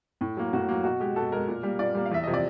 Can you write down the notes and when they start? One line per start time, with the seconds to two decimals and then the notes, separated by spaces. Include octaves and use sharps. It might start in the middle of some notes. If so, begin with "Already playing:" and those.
0.21 A2
0.37 F#3 A#3
0.53 A2 F#4
0.69 F#3 A#3
0.84 B2 F#4
1.00 G#3 G4
1.16 B2 A4
1.32 G#3 A#4
1.48 A#2
1.63 G3 A#3
1.79 A#2 D5
1.95 G3 A#3
2.06 F5
2.11 E2 E5
2.23 C3 F3 D#5
2.34 D5